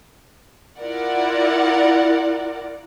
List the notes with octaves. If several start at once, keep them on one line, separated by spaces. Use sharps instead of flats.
E4 F4 A#4 D5 F#5